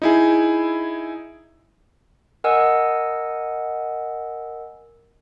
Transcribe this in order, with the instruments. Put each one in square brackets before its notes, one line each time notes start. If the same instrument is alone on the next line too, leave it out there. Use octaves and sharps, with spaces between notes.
[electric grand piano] D#4 E4 G#4
[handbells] A#4 D#5 F#5 G#5 E6